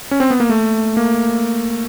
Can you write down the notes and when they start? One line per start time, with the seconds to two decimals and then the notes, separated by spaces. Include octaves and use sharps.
0.11 C#4
0.20 C4
0.30 B3
0.40 A#3
0.49 A3
0.97 A#3